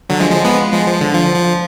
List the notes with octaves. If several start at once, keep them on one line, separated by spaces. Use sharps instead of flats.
D3 F#3
F3 G#3
F3 G#3
G#3 B3
F3 G#3
F3
D3
F3
F3